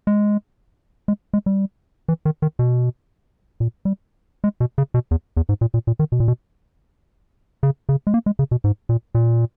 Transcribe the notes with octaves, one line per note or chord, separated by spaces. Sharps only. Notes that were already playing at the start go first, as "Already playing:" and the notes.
G#3
G#3
G#3
G3
E3
D#3
D#3
B2
A#2
G3
G#3
B2
C#3
B2
E2
E2
G#2
A#2
A#2
A#2
D#3
B2
A#2
B2
C#3
C#3
G#3
A#3
G#3
C#3
B2
G#2
A#2
A#2